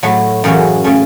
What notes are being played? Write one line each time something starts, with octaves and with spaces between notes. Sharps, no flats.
A2 F#3 A3 F#4
F#2 C#3 E3 C#4 F#4
C#3 A3 C#4